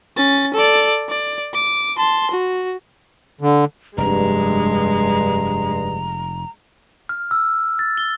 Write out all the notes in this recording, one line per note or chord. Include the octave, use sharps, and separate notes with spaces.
C#4 A6
A4 D5
D5
D6
A5 C6
F#4
D3
F1 G2 G#3 A#5
F6
E6
A6
G7